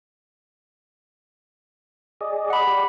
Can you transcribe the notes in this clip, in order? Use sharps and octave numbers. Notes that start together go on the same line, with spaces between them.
G#4 D5 D#5
F#5 B5
G4 D5